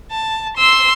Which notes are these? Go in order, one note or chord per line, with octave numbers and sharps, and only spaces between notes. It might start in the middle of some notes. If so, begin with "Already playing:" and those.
A5
C6 E6